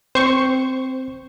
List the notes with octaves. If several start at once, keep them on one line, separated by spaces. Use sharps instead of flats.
C4 C5 C#6